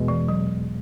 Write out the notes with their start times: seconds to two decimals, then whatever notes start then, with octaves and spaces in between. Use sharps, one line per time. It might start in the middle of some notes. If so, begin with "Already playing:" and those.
Already playing: E2 B2 G#3
0.08 E3
0.28 F#3